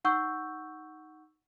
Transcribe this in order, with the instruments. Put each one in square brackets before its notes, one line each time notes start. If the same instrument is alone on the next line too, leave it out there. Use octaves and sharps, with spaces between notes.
[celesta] D#4 F#5 C#6 E6 G6